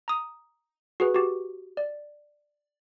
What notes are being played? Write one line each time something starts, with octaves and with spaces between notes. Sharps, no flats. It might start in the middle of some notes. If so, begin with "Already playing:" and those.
A#5 D#6
F#4 G#4 B4
F#4 G4
D5